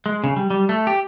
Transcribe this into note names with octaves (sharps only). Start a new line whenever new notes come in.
G#3
C#3
G3
G3
A3
G4